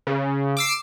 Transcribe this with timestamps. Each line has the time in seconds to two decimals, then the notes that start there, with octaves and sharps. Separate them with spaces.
0.07 C#3
0.57 D6 E6 C7